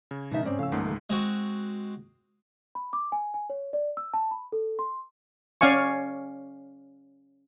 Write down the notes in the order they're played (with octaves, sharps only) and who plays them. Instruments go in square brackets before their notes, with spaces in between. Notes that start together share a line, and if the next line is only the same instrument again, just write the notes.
[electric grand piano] C#3 [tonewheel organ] G#6
[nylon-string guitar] B2 D#3 E5 [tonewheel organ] F3 G#3 A#6 [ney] D#4
[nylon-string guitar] G#2 D5 [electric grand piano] C4 [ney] C#4
[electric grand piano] A2 E6 [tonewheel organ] C#3 F3 A4 [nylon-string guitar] F5
[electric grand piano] C#2 G#2 F#5 [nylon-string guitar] D#3 A3 A#3
[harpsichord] G#3 C4 F#4
[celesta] B5
D6
G#5
G#5
C#5
D5
E6
A5
B5
A4
C6
[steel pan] C#4 D5 F5 G#5 C#6